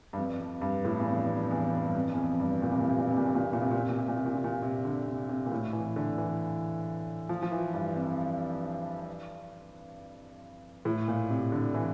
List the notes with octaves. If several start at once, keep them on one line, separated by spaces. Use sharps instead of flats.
G2
F2
F2
G2
A2
E2
F2
F2
F2
E2
F2
G2
F2
E2
F2
G2
A#2
C3
A#2
C3
A#2
C3
A#2
C3
A#2
C3
A#2
C3
A#2
C3
A#2
C3
A#2
C3
A#2
C3
A#2
C3
D3
C3
C3
A#2
A2
E3
D3
E3
F3
F3
E3
G2
F2
A2
A#2
C3
D3
E3